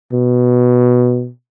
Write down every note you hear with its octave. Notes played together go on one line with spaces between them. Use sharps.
B2